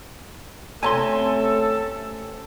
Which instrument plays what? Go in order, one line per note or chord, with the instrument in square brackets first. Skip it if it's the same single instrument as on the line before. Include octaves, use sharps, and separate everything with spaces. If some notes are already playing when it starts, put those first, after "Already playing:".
[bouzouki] C3 C4 C#4 [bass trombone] A3 [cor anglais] A4 [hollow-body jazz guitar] G#5 A5 C6